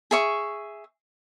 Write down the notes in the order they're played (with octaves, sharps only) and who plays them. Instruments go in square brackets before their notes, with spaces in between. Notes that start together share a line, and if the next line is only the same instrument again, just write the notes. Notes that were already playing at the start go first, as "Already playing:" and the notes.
[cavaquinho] G#4 E5 C#6